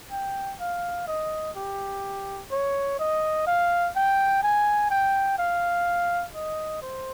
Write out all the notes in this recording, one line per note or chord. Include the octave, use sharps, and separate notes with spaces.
G5
F5
D#5
G4
C#5
D#5
F5
G5
G#5
G5
F5
D#5
C5